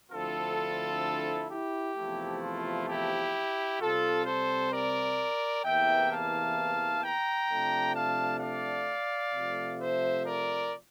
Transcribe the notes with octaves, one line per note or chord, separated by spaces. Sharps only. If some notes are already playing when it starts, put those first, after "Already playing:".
D2 D3 F3 C4 E4 F4 A4
E4 G4
E2 C3 F3 A3 E4
F4
E4 G4
C3 G3 C4 F4 A4
A4 C5
A#4 D5
E2 C3 E3 A#3 E5 G5
F5 A5
G5 A#5
C3 F3 A3 D4
F5 A5
D5 F5
C3 F3 A3
C5 E5
A#4 D5